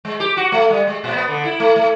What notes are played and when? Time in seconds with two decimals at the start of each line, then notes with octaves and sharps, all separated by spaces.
0.05 G#3
0.20 G4
0.37 F#4
0.52 A3
0.70 G3
0.87 G#3
1.04 A#2
1.16 B3
1.28 D3
1.45 E4
1.60 A3
1.76 A3